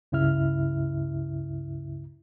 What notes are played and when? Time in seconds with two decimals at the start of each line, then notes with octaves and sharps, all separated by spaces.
0.12 C#2 G2 C#3 E4 E5 F6